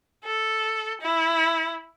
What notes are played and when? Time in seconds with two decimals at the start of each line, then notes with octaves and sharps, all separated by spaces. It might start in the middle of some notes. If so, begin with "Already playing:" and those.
0.25 A4
1.01 E4